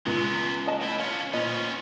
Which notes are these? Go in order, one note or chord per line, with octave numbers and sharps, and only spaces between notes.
C#2 G#3 B3
A#3 D#5 A5
A2 E4 B5
C#4 D4 F4
A#2 B3 C#4 C5 D#5